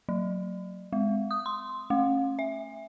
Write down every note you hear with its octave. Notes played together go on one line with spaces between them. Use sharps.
F#3
G#3
D#6
C6
A3
E5